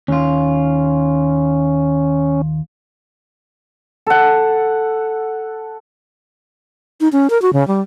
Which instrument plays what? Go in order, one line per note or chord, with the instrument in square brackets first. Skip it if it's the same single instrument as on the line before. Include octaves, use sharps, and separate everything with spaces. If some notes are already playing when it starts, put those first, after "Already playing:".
[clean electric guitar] D#2 F4 [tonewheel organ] C#4
[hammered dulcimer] A4 F#5
[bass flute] D#4
C#4
A#4
F#4
C#3
G3